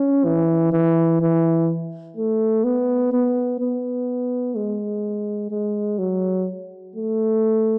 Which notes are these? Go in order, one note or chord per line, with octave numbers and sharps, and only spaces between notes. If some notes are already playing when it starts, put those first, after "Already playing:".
Already playing: C#4
E3
E3
E3
A3
B3
B3
B3
G#3
G#3
F#3
A3